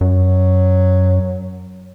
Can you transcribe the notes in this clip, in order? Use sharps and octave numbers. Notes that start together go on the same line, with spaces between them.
F#2 F#3